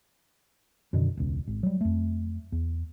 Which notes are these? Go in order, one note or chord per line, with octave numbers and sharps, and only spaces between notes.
F#2 B2 D3 D#3
E1 C#2
G#1
F#3 G3
F2 A3
E2